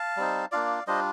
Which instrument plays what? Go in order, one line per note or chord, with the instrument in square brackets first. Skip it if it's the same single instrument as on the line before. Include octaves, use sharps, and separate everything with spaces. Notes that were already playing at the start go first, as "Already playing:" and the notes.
Already playing: [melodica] F5 A5
G3 C4 D#4
A#3 D4 F4 D5 F5
G3 D4 F4 C5 D#5